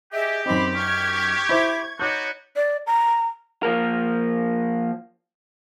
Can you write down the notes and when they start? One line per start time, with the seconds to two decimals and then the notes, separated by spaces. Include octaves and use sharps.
0.13 G4 G#4 D#5 E5
0.46 F#2 C4 D#4 B5 D6
0.76 C#6 F6 G#6
1.49 E4 C5 E5 B5 D6
1.99 B3 D#4 F#4 C#5 D6 G6
2.56 D5
2.87 A#5
3.63 F3 A#3 A#4